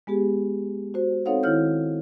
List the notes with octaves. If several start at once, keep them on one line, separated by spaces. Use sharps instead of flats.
G#3 B3 G4 G#4
F#4 C5
C4 D#4 A4 C#5 F5 F#5
D#3 E4 C#5 F6 G6